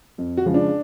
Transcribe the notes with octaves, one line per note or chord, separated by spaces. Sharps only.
F2
F#4
C#3 F3 G#3
D4